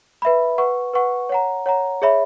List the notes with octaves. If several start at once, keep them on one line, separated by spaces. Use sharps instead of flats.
B4 E5 B5
B4 F#5 C#6
B4 F#5 C#6
C#5 F#5 A#5
C#5 F#5 A#5
G#4 C#5 E5 B5